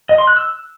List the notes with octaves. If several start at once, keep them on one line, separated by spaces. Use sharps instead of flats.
D#5
C6
F#6
E6